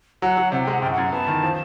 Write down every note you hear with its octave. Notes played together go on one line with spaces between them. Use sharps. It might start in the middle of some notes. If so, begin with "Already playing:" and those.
F#3 F#5
F#3
C3 F#5
G5
G#3 F#5
F#2 G5
F#5
F#2
B3 A5
D#3
F3